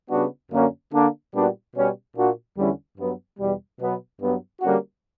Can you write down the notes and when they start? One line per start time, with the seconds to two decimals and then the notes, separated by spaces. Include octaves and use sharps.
0.10 C#3 G3 B3 D4 F#4
0.51 F#2 D3 A#3 C#4 F#4
0.93 D3 A#3 D4
1.33 A#2 G3 B3 D4 F#4
1.75 B2 G3 C#4
2.16 A#2 A#3 D4 F#4
2.56 E2 D3 G3 C#4 E4
2.97 G2 F#3 B3
3.39 E2 B2 G3
3.79 B2 F#3 B3
4.20 G2 F#3 B3
4.61 D3 G3 A#3 C#4 F#4